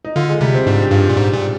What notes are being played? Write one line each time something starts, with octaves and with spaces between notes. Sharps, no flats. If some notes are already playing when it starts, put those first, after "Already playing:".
D#4
D3 F4
G#3
C3 G3
C4
G#2 D4
G4
G2 F4
A#2
G#2
A#2